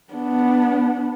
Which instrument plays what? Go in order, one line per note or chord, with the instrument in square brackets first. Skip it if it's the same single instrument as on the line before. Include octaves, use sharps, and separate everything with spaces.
[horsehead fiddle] B3 D4